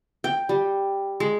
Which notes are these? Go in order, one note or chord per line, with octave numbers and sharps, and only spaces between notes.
G5
G3
G#3